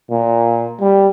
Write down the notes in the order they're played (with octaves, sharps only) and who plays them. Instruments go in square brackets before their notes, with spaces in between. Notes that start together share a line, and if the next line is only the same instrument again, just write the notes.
[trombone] A#2
G3